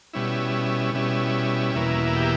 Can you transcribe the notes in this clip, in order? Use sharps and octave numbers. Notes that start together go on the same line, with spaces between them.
B2 G3 C#4 E4
B2 G3 C#4 E4
E2 B2 A#3 E4
G4